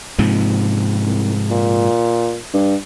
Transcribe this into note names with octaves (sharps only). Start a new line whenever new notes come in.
G#2 C3 F3
C2
A#2
G2